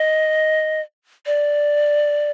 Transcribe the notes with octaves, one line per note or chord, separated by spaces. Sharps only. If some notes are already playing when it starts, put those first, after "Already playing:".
Already playing: D#5
D5